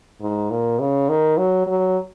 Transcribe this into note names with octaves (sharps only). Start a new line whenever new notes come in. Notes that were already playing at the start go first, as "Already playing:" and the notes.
G#2
A#2
C#3
D#3
F#3
F#3